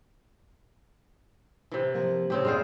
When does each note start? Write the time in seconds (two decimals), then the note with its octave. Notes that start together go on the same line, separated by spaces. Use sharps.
1.71 C3 E3
1.94 F3 A#3
2.30 A2 C#3 C4 G4
2.45 E2 G2 G#3 F4 G#4 C5